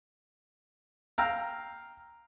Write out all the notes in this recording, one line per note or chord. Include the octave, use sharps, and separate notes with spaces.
F5 G5 A#5 E6 F6